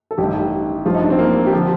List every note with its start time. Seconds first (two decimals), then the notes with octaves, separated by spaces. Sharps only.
0.11 A4
0.18 A1 G2 D#3 G4
0.85 A1 G2 F3 F4
0.95 D#4
1.02 D4
1.10 C4
1.19 A#3
1.47 G4
1.52 D3 F3 F4